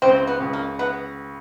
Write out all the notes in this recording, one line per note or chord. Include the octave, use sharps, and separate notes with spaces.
C#2 C4
B3
C#2
A#3
B3